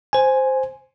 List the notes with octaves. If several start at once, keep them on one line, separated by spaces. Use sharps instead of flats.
C5 G#5